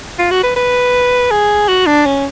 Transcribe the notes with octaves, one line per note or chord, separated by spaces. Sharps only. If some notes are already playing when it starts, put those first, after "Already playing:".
F4
F#4
B4
B4
G#4
F#4
D4
C#4